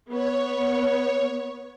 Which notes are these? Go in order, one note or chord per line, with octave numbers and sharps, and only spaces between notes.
B3 C#5